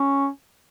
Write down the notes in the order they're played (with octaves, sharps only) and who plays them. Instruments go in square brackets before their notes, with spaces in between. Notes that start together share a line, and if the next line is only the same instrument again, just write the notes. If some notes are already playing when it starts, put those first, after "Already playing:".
Already playing: [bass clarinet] C#4